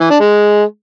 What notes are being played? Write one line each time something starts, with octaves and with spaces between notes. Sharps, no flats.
E3
D4
G#3